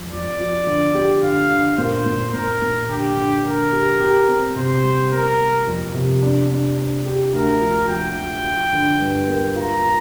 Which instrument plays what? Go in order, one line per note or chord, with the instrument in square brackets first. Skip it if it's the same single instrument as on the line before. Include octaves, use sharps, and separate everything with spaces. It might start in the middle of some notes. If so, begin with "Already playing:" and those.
Already playing: [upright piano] F2
[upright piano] F2 [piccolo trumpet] D5
[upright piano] F3
D3
G4
[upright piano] D3 [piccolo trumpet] F5
[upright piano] D3
[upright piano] A#2 [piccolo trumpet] C5
[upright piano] A#2
[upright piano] A#2 [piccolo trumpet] A#4
[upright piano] A#2
[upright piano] D3 [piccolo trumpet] G4
[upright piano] D3
[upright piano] D3 [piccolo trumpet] A#4
[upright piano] G4
G4
C4
[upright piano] C3 [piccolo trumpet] C5
[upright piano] G3
[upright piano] A#3 [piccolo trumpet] A#4
[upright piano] A#3
F2
C3
D4
D4
D4
G4
[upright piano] D2 [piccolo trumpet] A#4
[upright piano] F3
[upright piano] F3 [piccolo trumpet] G5
[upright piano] F3
F4
D3
G2
A#3
[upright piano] F4 [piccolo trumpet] A#5
[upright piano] F4